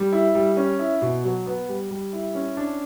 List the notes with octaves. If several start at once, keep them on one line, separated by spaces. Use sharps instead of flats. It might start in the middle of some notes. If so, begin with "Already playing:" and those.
Already playing: G3
E4
G3
C#4
E4
B2
F#3
B3
G3
G3
E4
C#4
D4